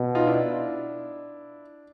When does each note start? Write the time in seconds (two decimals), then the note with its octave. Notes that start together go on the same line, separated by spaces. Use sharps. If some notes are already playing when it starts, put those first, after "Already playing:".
Already playing: B2
0.15 D#4 F4
0.27 D4 E4